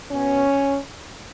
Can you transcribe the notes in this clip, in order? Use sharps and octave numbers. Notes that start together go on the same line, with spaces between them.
B2 B3 C#4